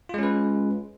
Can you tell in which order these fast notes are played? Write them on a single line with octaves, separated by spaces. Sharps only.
F4 G#3 C#4 B4